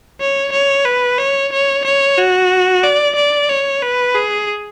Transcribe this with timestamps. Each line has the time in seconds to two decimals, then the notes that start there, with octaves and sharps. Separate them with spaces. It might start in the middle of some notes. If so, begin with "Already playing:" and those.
0.20 C#5
0.52 C#5
0.85 B4
1.18 C#5
1.52 C#5
1.85 C#5
2.17 F#4
2.83 D5
3.16 D5
3.48 C#5
3.82 B4
4.15 G#4